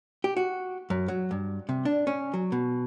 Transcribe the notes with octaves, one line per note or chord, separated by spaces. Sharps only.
G4
F#4
F#2
F#3
G2
C3
D4
C#4
F#3
B2